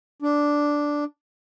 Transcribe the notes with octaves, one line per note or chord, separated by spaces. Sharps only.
D4